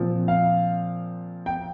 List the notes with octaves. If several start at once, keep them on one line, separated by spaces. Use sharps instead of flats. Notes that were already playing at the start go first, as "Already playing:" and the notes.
Already playing: A#2 F3 C4
F5
G5